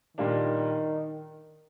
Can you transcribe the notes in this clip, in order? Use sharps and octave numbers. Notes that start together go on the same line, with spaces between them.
A#2 D#3 G3 A#3 D4